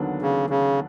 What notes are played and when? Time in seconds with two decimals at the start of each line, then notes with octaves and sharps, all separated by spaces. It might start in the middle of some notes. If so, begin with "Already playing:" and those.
Already playing: D#2 D3 F#3 B3 D4
0.22 C#3
0.50 C#3